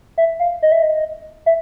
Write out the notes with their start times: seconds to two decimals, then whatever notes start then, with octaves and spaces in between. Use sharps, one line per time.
0.18 E5
0.40 F5
0.63 D#5
0.72 E5
0.82 D#5
1.46 E5